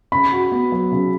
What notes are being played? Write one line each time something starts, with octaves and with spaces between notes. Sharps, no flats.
C#3 B5
F#4
B3
F#3
C#3